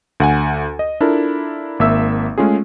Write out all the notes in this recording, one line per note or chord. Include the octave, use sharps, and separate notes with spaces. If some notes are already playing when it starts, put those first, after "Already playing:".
D2 F#5 G#5
D#5
D4 E4 F4 A4 A#4
G#1 A#3 E5 E6
G#3 A3 C#4 F4 G#4